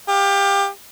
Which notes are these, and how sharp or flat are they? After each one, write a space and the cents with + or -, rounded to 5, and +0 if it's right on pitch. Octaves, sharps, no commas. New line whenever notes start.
G4 +25 F5 +30